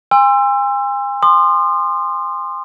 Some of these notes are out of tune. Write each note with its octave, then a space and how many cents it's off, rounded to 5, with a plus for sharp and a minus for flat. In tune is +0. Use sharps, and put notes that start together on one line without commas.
G#5 -40 C6 +0 E6 +25
C6 +0 D#6 -40